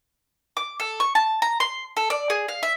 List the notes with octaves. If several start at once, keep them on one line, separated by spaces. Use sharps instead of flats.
D6
A4
C#6
A5
A#5
C6
A4
D5
G#4
F5
E5